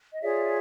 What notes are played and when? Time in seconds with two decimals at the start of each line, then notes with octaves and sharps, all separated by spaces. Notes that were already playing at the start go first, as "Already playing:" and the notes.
0.12 D#5
0.21 F4 G#4 C#5 D5 E5